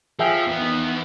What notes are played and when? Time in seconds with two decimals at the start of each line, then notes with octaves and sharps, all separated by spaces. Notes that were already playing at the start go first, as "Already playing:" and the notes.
0.19 F3 G#4 E5 G5
0.47 E2 B3
0.62 D#4